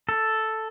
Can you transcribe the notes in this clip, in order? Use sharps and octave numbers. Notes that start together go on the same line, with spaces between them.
A4